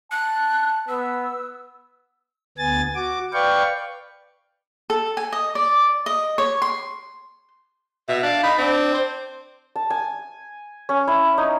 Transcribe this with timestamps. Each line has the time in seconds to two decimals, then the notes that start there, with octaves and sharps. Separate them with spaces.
0.12 A5 F#6
0.89 B3 E6
2.58 D2 B3 G#5 A6
2.95 F#4 D6
3.33 B4 D5 F5 G5 C#6
4.90 A4
5.17 G#5
5.32 D#5
5.55 D5
6.06 D#5
6.38 C#5
6.62 C6
8.09 B2 E5
8.23 D4 F5
8.43 D#4 B5
8.58 C4 D4
8.93 C5
9.76 A5
9.90 G#5
10.89 C#4
11.08 E4
11.38 D#4